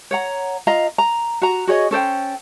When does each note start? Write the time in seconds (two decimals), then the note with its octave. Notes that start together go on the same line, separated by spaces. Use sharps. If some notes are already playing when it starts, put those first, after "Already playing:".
0.11 C#5 F#5 A#5
0.67 F4 D#5 F5 A#5
0.98 A#5
1.42 F#4 A#5
1.67 F#4 G#4 C#5 D#5
1.91 C#4 A4 C5 G5